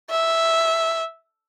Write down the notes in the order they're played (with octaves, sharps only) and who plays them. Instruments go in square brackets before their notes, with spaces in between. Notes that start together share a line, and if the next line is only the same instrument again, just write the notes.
[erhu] E5